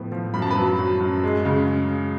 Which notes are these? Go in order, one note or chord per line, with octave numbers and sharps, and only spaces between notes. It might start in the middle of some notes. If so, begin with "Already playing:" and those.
Already playing: A2 F3 B3 A4
F3
F#2 B5
A5
B4 B5
F#3
F#3
F#2
G#3
C#3